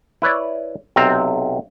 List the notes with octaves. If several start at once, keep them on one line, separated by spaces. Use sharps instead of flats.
E4 B4 C#5 D5
B1 C3 C4 A#5